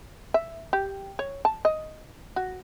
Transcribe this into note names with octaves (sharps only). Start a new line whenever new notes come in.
E5
G4
C#5
A5
D#5
F#4